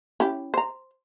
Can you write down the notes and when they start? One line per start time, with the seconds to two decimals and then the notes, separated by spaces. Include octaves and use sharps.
0.20 C#4 E4 G4
0.54 C5 A#5